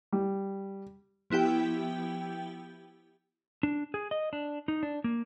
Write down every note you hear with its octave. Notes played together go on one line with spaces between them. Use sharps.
G3
F3 B3 E4 G4 G5
D4
G#4
D#5
D4
D#4
D4
A#3